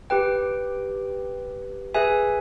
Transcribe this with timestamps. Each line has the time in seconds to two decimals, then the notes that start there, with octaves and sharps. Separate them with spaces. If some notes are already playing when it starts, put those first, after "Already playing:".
0.10 G4 B4 G5
1.94 G#4 B4 E5 G#5